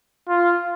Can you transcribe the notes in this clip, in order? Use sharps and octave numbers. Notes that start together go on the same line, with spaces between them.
F4